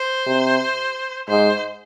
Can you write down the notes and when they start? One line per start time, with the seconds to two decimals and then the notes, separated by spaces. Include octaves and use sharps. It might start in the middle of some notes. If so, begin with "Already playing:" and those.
Already playing: C5
0.26 C3
1.29 G#2 C5